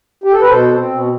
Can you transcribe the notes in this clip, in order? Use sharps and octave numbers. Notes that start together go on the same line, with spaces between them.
G4
A4
B4
B2 A4 C5
C4
B2